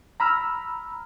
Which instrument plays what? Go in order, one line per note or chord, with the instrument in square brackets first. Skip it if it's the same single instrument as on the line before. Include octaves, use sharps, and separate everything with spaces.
[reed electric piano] A#5 B5 E6 F6